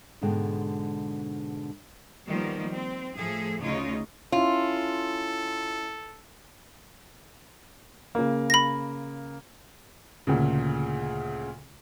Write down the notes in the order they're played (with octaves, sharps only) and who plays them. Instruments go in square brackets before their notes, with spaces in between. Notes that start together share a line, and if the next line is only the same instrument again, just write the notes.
[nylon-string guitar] G#2 B2 D3 G#3 G5
[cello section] D#3 F3 G3 A#3 B3
C4
A2 F3 G#4 A4
D2 C#3 D#4 F4 C#5 D#5
[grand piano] C#4 E4 [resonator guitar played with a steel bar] F4 [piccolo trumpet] A4
[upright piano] C#3 A#3
[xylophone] B5 A#6
[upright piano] D2 A#2 C#3